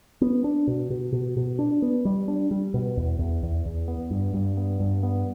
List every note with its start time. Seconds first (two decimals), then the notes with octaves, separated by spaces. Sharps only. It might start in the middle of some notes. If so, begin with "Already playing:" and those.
0.21 B3
0.44 D4
0.67 B2
0.90 B2
1.12 B2
1.37 B2
1.59 D4
1.82 B3
2.05 G3
2.28 D4
2.51 G3
2.74 B2
2.97 E2
3.19 E2
3.43 E2
3.66 E2
3.88 B3
4.11 G2
4.34 G2
4.57 B3
4.80 G2
5.03 B3